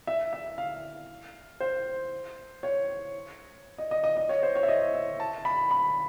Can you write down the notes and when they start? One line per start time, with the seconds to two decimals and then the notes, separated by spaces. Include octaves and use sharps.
0.07 E5
0.33 E5
0.58 F5
1.60 C5
2.63 C#5
3.78 D#5
3.91 D#5
4.04 D#5
4.17 D#5
4.29 C#5
4.43 C5
4.55 C#5
4.63 E5
4.68 D#5
4.94 E5
5.20 A5
5.45 B5
5.71 B5